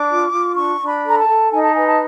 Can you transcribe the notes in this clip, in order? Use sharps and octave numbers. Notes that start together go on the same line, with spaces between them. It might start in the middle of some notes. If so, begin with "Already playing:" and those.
Already playing: D4 D6
F4
F4
D4 C#6
D4
B5
A4 A#5
A5
A4
D#4 G#5
A5
B4 G#5
A5